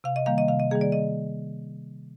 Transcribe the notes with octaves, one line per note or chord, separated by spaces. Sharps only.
C3 F5
D#5
D#3 G3 A#3 F5
D#5
C3 F5
D#5
D#3 G3 A#3 G#4
D5
D#5